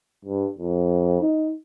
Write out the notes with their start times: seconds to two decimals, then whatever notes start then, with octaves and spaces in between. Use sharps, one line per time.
0.25 G2
0.58 F2
1.21 D#4